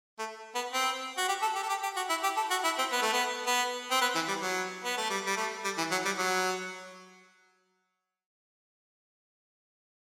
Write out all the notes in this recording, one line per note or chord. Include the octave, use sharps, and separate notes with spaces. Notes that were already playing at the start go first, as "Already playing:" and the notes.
A3
B3
C4
F#4
G4
A4
G4
A4
G4
G4
F#4
E4
G4
A4
F#4
E4
C4
B3
A3
B3
B3
C4
B3
E3
G3
F#3
B3
A3
G3
G3
A3
G3
E3
F#3
G3
F#3